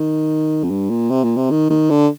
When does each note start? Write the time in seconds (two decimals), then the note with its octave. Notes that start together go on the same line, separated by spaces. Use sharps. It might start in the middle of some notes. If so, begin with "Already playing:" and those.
Already playing: D#3
0.64 F2
0.71 G2
0.90 A#2
1.10 C3
1.24 A#2
1.37 C3
1.51 D#3
1.70 D#3
1.90 D3